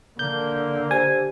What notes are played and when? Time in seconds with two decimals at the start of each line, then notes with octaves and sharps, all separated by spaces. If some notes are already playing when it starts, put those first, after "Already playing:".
0.19 D3 A#3 G6
0.91 G4 C5 G#5